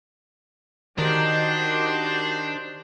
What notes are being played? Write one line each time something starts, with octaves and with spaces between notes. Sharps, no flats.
D#3 D4 D#4 F#4 G4 C5